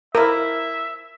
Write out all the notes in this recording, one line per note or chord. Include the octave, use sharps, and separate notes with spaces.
F3 A#3 E4 A#4 E5